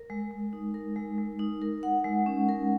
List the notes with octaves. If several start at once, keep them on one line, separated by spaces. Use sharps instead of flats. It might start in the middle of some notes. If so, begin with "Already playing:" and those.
Already playing: A#4
G#3
G#3
D#4
A#4
G#3
G#3
D#4
A#4
F#5
G#3
C#4
A#4